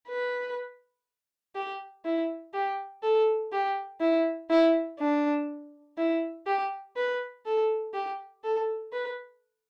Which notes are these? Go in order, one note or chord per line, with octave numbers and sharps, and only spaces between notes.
B4
G4
E4
G4
A4
G4
E4
E4
D4
E4
G4
B4
A4
G4
A4
B4